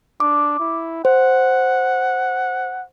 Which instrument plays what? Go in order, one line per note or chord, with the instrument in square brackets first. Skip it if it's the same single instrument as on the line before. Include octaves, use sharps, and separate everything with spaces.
[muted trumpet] D4 [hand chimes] D6
[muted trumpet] E4
[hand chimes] C5 [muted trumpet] F#5